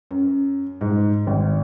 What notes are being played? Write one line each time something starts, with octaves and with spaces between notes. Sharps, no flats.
F#2
G#2
G#1